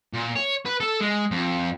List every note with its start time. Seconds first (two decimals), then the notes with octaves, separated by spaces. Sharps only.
0.13 A#2
0.35 C#5
0.66 B4
0.80 A4
1.00 G#3
1.31 F2